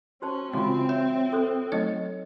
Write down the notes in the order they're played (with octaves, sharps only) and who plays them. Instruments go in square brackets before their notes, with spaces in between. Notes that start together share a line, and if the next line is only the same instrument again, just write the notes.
[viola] C#4 [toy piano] F#4 C5 A5
[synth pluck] C#3 E3 G#3 [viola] C4 [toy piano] F4 F#4 F5
[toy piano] C#5 [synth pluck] E5
[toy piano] A4 C5
[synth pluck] F#3 A3 C#5 [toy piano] D#4 D#5